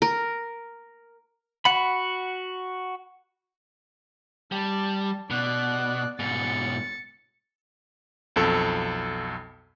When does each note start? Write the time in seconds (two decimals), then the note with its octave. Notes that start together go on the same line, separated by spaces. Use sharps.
0.02 A#4
1.65 F#4 F#5 B5
4.52 G3 A5
5.30 B2 D5 F#6
6.19 G#2 B2 A6 C#7
8.36 B1 F2 A4